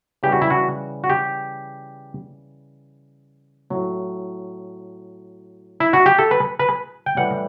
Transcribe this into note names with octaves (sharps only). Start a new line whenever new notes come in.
C#3 E3 G3 G4
F#4
E4
F#4
F#4
G4
A2 F#3
E4
F#4
G4
A4
B4
B4
G5
A2 E3 G3 F#5